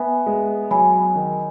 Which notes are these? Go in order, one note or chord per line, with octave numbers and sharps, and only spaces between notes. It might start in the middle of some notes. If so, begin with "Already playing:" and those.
Already playing: B3 E5 G#5
G#3
F#3 G#5 B5
D#3